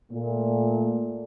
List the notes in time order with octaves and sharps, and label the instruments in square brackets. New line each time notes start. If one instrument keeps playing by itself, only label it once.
[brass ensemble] A#2 A3